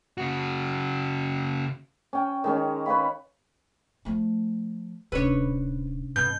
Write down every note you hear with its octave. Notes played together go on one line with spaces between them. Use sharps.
C#3 F#4
C#4 G5
D#3 G#3 C#4
B4 C#5 F5 B5
F3 A3
D1 C3 C#4 D4 B4 C#5
G#1 E2 B2 G6